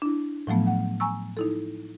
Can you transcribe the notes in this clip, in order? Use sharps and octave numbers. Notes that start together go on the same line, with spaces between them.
D4 E4
A2 F3 F#3 A3 B3
F#5
G#5 A#5 C#6 E6
D#4 E4 A4